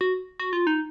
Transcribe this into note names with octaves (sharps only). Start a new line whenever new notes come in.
F#4
F#4
F4
D#4